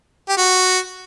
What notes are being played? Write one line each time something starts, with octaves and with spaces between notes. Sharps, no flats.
G4
F#4